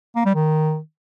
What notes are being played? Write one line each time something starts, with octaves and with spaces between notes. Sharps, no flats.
A#3
G3
D#3